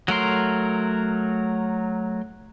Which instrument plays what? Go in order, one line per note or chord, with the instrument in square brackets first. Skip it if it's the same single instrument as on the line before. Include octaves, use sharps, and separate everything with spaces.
[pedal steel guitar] F#3 A3 A#4 C6